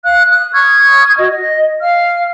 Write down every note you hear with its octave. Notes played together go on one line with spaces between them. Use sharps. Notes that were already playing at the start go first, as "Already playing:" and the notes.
F5 F#6
D#6 F#6
C#6 D#6 F6 G#6
F#4 D#5
D#5
F5 F6